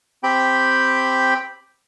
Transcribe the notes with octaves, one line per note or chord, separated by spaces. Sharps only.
C4 G4 G5 B5